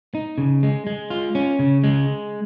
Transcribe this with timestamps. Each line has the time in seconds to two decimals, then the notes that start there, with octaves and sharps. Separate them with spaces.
0.15 D#4
0.38 C#3
0.63 G#3
0.87 G#3
1.10 F4
1.35 C#4
1.59 C#3
1.84 G#3